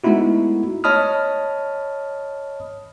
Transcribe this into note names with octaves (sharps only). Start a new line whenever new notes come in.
G#3 A3 B3 D#4 E4 F#4
C#5 D#5 A5 B5 D#6 F6